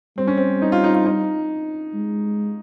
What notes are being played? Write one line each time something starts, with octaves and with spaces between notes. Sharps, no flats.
G3 C4
C#4
C4
D#4
F4
D#4
F4
D#4
G#3